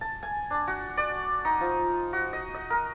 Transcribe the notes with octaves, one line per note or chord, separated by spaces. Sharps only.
A5
G#5
D4
F#4
D5
D#4
F3
F#4
D#5
D#5
A#4